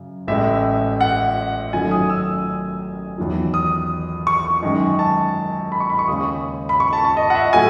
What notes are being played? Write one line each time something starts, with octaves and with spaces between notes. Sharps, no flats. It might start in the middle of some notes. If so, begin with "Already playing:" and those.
Already playing: F#2 C#3
A1 A2 G#3 E5
F#5
F#2 D#3 F#3 A3 G#5
D#6
E6
E2 D#3 F#3
D#6
C#6
F#2 D#3 G#3
A5
B5
C#6
B5
C#6
D#2 C#3 G#3 D#6
B5
C#6
A5
A5
D#5
F#5
E5
A2 F#3 A3 G#5